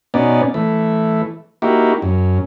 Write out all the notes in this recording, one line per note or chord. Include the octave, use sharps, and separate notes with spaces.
B2 B3 C#4 D#4 D5
E3 A3
A#3 D#4 E4 F#4 G4
F#2